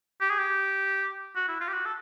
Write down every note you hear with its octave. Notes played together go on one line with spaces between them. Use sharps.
G4
G#4
G4
F#4
E4
F4
G4
F#4
A4